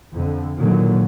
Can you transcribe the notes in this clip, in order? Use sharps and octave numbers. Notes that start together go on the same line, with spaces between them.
F2 D3
A#2 D3 D#3 F#3